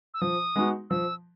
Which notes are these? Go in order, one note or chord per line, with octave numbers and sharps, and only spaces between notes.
E6
F3 D#6
G#3 B3 D#4 F#4
F3 E6